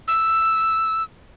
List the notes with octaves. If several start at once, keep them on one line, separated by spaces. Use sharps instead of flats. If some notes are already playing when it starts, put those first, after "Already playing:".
E6